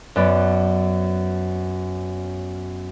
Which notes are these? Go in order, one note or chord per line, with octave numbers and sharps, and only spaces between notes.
F#2 B3 D5